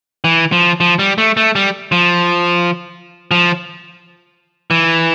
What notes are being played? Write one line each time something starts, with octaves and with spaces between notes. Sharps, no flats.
E3
F3
F3
G3
A3
A3
G3
F3
F3
E3